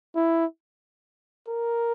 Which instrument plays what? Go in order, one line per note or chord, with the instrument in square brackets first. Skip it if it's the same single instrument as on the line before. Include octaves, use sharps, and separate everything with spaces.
[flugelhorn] E4
A#4